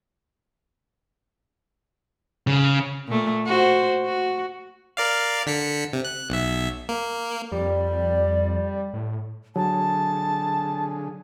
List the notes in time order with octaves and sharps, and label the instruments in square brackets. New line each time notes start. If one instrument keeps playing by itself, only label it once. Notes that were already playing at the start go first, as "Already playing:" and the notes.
[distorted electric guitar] C#3
[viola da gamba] A#2 A3
F#4 C5
F#4
[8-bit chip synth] A#4 D5 F5
D3 B6 C#7
C3
F#6
B1 E5
A#3
[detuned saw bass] F2 [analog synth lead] G3 [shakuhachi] D5
[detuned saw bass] A2
[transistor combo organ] D3 G#4 [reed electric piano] F#3 [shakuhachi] A5